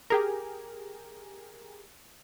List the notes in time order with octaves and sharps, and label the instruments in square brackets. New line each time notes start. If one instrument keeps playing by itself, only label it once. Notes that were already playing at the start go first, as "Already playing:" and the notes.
[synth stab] G4 G#4 A#4